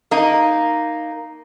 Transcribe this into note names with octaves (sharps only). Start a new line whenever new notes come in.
A#3 D#4